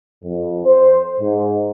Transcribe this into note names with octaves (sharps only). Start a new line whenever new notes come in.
F2
C5
G#2